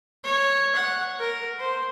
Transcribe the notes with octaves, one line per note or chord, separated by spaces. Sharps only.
C#5
F#5
A#4
C5